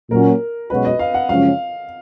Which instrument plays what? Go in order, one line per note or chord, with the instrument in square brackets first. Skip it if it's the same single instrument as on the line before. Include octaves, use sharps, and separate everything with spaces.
[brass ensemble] A#2 F#3 C#4 F#4 [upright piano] A#4
[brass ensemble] B1 B2 G#3 C#4 F#4 [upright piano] B4
[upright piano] D#5
F5
F#5
[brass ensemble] F#2 C#3 F3 G#3 C#4 [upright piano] F5